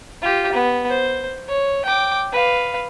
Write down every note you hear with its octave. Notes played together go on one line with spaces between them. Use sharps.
F4 G4
B3
C5
C#5
G5 D6
B4 F5